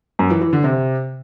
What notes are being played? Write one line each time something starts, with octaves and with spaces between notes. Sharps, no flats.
F#2
E3
E3
D3
C3